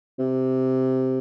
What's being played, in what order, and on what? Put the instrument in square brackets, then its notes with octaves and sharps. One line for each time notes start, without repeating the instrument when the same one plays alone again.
[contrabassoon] C3